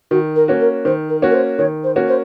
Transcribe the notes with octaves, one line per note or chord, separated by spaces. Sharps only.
D#3 F#4
A#4
A#3 C#4 F#4
A#4
D#3 C5
A#4
A#3 C#4 F#4
A#4
C5
D#3 C#5
C5
A#3 C#4 F#4
C5